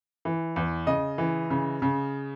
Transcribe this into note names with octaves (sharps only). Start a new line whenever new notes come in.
E3
E2
C#3 D#5
E3
C#3
C#3